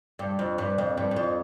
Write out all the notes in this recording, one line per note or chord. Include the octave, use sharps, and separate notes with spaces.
G2
F2
G2
F2
G2
G2
F2